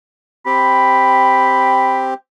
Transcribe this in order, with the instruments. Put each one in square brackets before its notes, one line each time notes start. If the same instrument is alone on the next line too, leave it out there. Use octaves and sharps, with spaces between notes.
[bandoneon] C4 G4 [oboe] B5